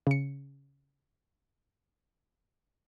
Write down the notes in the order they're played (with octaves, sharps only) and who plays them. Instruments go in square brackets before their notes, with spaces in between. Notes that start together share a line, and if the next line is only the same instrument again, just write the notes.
[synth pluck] C#3 C#7